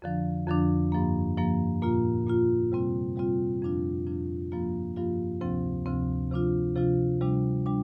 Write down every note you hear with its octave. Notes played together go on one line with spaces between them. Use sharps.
F2 D3 F3 D4
F2 D3 F3 D4
G2 F3 A#3
G2 F3 A#3
A#2 A#3 F4
A#2 A#3 F4
C3 G3 C4 F4
C3 G3 C4 F4
F2 F3 D4 F4
F2 F3 D4 F4
G2 F3 A#3 F4
G2 F3 A#3 F4
D2 C3 F3 C4
D2 C3 F3 C4
C3 F3 D4 F4
C3 F3 D4 F4
C3 G3 D4
G3 D4